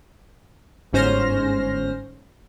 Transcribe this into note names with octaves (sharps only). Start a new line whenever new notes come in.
G1 G#2 C#4 C5 F6 A#6